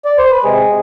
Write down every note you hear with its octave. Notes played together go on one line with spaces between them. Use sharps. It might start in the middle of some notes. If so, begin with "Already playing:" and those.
D5
C5
B4
C3 G#3 G#4
C3